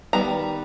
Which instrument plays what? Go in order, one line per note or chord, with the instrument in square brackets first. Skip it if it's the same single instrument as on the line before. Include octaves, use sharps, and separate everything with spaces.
[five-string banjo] D#3 G3 B3 A#5